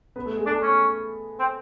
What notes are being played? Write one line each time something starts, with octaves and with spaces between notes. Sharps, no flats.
B3 B4
A3 A4
G#3 G#4
A3 D4 A4
C#4
C4